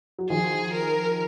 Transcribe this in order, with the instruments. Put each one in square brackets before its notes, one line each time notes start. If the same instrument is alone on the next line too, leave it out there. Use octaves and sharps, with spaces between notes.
[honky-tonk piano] F#3
[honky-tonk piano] D#3 F3 [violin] G#4
[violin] A#4